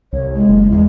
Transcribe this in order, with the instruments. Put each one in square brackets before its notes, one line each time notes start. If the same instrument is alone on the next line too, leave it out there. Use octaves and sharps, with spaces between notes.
[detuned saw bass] C2 [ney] C#5
[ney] G#3
[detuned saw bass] F#1
[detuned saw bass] E2 [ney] G#3